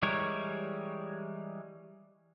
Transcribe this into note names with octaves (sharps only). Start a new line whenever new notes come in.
E3 G3 G#3 A#4 C#5